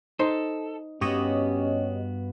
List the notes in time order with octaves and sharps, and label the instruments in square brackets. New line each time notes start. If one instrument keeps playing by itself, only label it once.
[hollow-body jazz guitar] D#4 C5 C6 [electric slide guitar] A4
[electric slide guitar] G2 B3 F#4 [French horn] C#4 [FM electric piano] G4 C#5 D#5